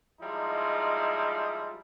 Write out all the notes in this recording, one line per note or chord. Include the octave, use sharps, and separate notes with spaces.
F3 G3 G#3 D#4 E4